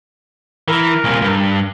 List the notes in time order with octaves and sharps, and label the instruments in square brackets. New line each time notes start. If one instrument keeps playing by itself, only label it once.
[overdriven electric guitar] E3 [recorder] A#4
[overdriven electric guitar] C2 A#2
G2